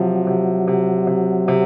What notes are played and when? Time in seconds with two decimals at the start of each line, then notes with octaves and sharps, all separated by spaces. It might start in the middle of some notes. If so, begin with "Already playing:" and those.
Already playing: C3 F3 F#3
0.27 C3
0.68 C3
1.07 C3
1.48 C3